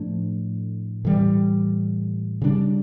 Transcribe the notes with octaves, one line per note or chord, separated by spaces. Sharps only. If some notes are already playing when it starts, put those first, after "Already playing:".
Already playing: A2 F3 A3 D4
A2 E3 G3
C#3 G3 D4